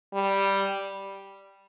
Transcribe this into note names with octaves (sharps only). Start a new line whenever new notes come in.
G3